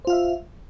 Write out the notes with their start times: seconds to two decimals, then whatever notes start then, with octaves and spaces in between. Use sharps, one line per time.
0.05 C5
0.07 F4
0.10 F5
0.13 E5